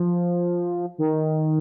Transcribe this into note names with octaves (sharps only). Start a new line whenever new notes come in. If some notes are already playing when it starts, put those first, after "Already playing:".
Already playing: F3
D#3